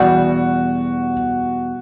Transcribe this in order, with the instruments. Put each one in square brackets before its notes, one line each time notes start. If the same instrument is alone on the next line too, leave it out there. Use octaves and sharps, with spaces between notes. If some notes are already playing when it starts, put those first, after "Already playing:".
Already playing: [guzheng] E2 B2 G3 [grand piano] F#4